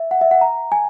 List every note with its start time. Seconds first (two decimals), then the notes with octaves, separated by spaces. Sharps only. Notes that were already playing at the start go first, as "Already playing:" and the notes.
Already playing: E5
0.11 F#5
0.21 E5
0.31 F#5
0.41 A#5
0.72 G#5